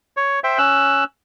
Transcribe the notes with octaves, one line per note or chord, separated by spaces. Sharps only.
C#5
C5 E5 G5
C#4 E6 F#6